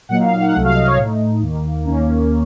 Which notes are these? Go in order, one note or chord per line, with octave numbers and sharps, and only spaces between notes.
A#2 F#3 A#3 D#4 F#5
F5
F5
F#5
C2 C3 F#3 A3 F#5
F5
D#5
C#5
A2 A3 D#4
D#2 D#3 A#3
D#2 D#3 A#3 C#4